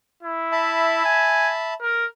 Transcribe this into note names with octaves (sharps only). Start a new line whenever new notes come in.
E4
E5 A5 B5
G#5
A#4